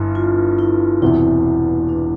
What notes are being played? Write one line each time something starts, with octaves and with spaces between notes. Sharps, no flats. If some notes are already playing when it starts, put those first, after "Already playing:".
Already playing: G1 G2 E4
F4
E4
E1 E2 C3 E3 E4
D4